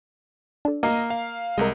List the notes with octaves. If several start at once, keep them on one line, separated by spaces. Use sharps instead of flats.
D4 A4
A#3 D#5
F5
C2 G#3 A#4 D#5